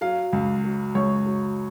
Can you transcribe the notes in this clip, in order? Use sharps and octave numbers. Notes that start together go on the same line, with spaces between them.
F#3 F5
C#2
F#3
C#2 C#5
F#3